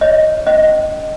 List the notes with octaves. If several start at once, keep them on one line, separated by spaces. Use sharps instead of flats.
C#5 D#5
C#4 D#5